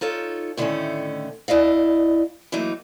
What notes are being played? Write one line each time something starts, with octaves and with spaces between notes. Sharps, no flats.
D#4 F4 A4 C#5
A2 D3 D#3 G3 A3 C#4
E2 E4 D5 D#5 F5
E3 F#3 A3 A#3 D#4